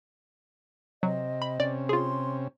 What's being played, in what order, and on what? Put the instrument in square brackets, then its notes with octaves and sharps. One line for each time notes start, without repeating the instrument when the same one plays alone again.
[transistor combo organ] C3 [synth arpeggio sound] F#3 [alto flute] D#5
[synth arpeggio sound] B5
[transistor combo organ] C3 C#4 [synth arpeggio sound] D5
[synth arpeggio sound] F4 G#4 [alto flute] C6